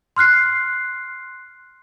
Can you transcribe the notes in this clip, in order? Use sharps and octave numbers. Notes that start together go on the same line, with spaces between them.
C6 F6 F#6 C7